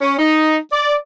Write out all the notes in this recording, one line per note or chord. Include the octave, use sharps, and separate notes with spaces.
C#4
D#4
D5